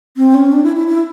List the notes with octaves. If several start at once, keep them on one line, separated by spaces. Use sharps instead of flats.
C4
C#4
D4
E4
E4
E4